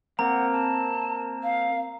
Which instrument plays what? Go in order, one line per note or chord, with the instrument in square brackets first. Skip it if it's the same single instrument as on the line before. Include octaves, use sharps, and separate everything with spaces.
[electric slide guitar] A#3 C4 [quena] F#5 [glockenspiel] A#5
[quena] A5
F5